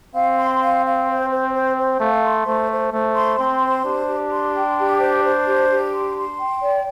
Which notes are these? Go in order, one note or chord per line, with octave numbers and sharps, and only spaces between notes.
C4 F5
C6
F5
F5
C5
C5
C5
C5
A3 F5
C6
A3 C5
C5
A3 C5
C6
C4 C6
C5
D4 G4
G4
C6
G5
G4
C5
C5
G4
G4
C6
C6
G5
D5